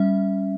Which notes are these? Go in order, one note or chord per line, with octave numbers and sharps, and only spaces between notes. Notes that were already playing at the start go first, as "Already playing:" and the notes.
Already playing: G3 C#4 E5